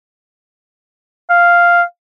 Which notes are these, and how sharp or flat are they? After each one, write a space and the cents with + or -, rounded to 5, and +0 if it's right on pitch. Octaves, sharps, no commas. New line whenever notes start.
F5 -5